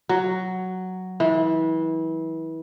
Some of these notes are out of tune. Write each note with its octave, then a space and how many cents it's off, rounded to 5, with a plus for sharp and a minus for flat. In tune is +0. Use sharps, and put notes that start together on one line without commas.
F#3 +5
E3 -30